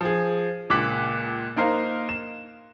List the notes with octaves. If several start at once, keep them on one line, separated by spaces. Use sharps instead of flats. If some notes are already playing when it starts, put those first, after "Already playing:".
F3 G#4
C#2 A#2 D6 F#6 B6
A#3 D#4 A#4 C5 F5
E7